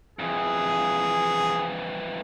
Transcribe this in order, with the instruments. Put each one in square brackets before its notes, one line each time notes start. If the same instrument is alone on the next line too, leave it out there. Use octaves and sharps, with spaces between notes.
[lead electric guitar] F2 E3 [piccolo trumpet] G#4